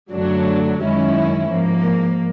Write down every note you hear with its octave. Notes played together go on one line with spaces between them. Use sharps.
F#2 D3 F#3 A3 D4
F#2 D#3 G#3 C#4 E4
G#2 F3 A#3